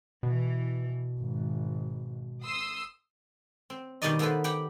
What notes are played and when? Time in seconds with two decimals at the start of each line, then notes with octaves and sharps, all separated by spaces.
0.23 B2 E3
1.18 G#1
2.43 C6 D#6 E6
3.70 C4
4.02 B2 D#3 G3 D#4 D5 D#5
4.19 A#3 B3 D#4 A4 B4 C5
4.44 G4 B4 F#5 G5